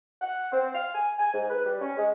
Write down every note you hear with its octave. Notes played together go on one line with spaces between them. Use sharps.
F#5
C4
F5
G#5
G#5
G#2
B4
G3
C#4
G#3